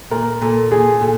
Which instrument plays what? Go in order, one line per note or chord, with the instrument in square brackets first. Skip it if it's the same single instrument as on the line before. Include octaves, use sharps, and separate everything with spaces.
[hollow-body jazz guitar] A#2 [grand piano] A#4
[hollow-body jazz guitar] A#2 [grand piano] A4
[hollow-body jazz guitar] A#2 [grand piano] G#4
[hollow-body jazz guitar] A#2 [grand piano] A4